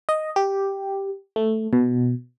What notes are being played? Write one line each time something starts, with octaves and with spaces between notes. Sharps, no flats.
D#5
G4
A3
B2